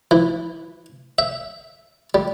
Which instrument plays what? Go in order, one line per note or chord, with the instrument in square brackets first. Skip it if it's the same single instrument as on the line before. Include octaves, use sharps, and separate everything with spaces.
[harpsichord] E3
E5
G3